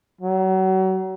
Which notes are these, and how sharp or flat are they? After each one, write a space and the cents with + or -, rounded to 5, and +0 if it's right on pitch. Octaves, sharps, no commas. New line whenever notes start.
F#3 +35